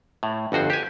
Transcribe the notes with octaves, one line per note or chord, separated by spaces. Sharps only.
A2
G1 F2 F#4 C5
G4 G#5